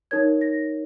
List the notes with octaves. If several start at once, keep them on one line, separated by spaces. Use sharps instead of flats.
D#4 A#4 C#5 G#6
A#6